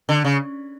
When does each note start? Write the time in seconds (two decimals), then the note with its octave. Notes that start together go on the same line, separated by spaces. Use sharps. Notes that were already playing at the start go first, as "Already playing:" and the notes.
0.09 D3
0.24 C#3